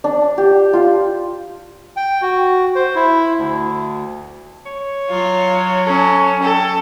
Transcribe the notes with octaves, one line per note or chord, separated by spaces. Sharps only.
D4
G4
F4
G5
F#4
C5
E4
D2
C#5
F#3 F4
C#4 A4
A4 G5